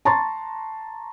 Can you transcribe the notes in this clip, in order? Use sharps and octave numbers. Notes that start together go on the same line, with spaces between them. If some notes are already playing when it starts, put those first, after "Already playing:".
A5 A#5 C6 C#6 A6